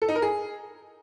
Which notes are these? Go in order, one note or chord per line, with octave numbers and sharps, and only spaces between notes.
A4
D#4
A#4
G#4